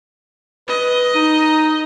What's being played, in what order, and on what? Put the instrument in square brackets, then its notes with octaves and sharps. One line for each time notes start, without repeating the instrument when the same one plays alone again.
[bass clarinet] B4 [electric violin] D#5
[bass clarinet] D#4